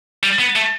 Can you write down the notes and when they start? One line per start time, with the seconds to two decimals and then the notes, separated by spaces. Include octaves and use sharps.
0.23 G3
0.39 B3
0.56 A3